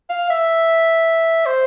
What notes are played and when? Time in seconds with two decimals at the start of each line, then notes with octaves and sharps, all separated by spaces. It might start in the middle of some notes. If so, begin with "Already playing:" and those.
0.10 F5
0.30 E5
1.46 C5